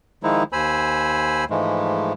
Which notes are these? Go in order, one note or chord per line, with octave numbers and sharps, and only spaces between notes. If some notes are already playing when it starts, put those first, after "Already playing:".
D#3 F3 G#3 D#4 E4
D#2 C5 G#5 B5 E6
G#2 E3 F3 G#3 A3